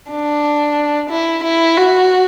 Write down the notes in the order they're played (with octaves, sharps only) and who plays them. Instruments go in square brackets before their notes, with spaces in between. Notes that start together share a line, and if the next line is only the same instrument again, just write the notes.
[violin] D4
E4
E4
F#4